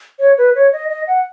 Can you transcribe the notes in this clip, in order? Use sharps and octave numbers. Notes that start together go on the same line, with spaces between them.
C#5
B4
C#5
D#5
D#5
F#5